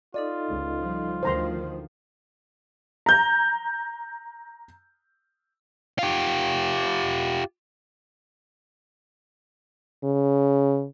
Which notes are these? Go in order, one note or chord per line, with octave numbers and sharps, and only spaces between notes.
D#4 F4 A4 D5 D#5
C#2
F3 G3
D2 D#3 F3 C5 A#5 C6
A#5 G6
F4 G4
C#3